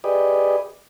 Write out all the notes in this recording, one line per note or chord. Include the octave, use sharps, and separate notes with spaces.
G4 G#4 B4 D5 D#5